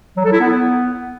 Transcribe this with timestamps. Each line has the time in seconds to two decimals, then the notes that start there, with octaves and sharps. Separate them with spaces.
0.17 F#3
0.25 A4
0.33 E4
0.40 B3